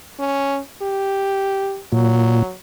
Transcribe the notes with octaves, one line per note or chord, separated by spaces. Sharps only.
C#4
G4
A#2 F#3